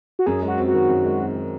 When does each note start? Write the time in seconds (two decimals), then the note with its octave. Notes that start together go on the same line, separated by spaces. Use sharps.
0.19 F#4
0.26 F#2 G#4
0.42 G#3
0.48 F#4
0.58 C4
0.68 F#4
0.74 D#3
0.89 F#2
1.05 G#3
1.20 C4
1.36 D#3